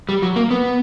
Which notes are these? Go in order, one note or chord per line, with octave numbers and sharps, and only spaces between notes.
G3
F#3
A#3
B3